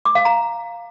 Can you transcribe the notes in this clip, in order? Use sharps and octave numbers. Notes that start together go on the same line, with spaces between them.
D6
F5
A#5